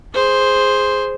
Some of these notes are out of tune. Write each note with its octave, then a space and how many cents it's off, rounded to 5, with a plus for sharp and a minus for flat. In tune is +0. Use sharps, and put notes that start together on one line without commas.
G#4 +0 C5 +0